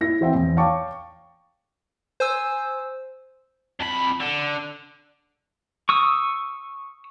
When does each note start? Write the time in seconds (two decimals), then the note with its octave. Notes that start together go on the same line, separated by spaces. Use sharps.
0.01 E4 A#6
0.21 E3 C4 E5 G5
0.35 E2
0.57 C#5 F5 G5 A5 C#6 D6
2.20 C5 G#5 E6
3.80 F2 B5
4.20 D3
5.89 C#6 D#6 E6